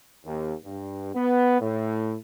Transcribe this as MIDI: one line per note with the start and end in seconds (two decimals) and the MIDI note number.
0.25 0.53 39
0.64 1.11 43
1.15 1.58 59
1.60 2.15 45